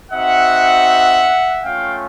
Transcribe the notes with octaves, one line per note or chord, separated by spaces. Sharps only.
C4 D#4 F#4 E5 F#5
A3 C#4 F4 F5 G5